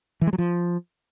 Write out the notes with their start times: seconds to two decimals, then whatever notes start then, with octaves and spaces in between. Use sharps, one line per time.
0.21 E3
0.27 G#3
0.33 F#3
0.38 F3